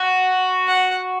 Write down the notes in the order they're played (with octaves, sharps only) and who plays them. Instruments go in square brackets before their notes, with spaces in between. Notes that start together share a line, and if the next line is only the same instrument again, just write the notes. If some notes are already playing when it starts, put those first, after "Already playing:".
Already playing: [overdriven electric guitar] F#4
[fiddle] F#5